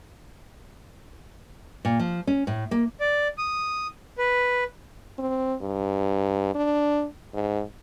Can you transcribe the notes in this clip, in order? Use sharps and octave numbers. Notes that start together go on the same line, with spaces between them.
A#2
F3
C#4
A2
A#3
D5
D#6
B4
C4
G2
D4
G#2